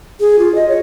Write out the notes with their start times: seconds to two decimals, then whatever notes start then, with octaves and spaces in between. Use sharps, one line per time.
0.20 G#4
0.39 F4
0.55 D#5
0.69 C#5